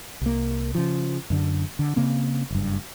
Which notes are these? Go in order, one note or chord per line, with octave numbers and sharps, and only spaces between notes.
C2 A#3
C#3 F3
F#2 D3
D3
C#3 A#3 C4
F#1 G2